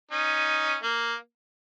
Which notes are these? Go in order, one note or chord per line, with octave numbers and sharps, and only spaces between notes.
C#4 D#4
A#3